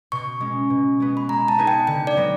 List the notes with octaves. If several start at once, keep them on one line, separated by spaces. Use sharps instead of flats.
B2 C#6
G#3 C#4
B2
G#3 B3
B5
G#3 A#5
A5
B3 D#4 G#4
G5
D3 G5
D5
F#3 B3 D#4